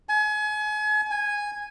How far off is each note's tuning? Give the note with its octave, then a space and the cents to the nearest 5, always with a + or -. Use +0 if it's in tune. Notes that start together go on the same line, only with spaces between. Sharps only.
G#5 +35
G#5 -10